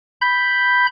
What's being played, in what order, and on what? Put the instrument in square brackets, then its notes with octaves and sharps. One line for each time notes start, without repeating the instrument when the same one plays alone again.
[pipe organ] B5 G6